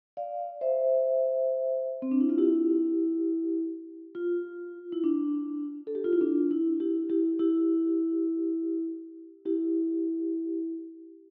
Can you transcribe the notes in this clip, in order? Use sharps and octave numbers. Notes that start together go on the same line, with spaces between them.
D5 F5
C5 E5
C4
D4
E4
F4
E4 G4
F4
E4
D4
A4
G4
F4
E4
D4
E4
E4 G4
E4 G4
E4 G4
E4 G4